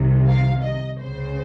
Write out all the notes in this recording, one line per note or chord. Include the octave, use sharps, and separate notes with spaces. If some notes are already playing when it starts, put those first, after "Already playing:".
Already playing: C2 C3 D#3
F5
D#5
C#2 C#3 C5